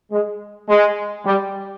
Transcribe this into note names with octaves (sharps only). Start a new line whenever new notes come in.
G#3
G#3
G3